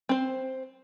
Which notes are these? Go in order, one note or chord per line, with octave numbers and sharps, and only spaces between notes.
C4 C5